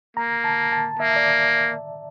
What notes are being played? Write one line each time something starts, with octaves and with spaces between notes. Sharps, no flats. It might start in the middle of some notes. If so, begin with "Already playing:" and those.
A#3 A#5
A5
A5
A#3 E5
D5